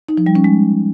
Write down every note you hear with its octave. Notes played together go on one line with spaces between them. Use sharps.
D#4
F3
G3
C#4
G#3